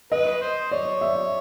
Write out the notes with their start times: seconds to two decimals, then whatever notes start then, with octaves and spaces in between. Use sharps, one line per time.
0.12 B4 D#5
0.41 C5
0.71 C#5 D5
1.01 E5